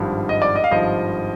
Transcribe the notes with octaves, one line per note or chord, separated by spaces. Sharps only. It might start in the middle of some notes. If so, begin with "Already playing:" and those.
Already playing: G#1 G2 F3
D#5
D5
D#5
F5
G#1 G2 F3 D#5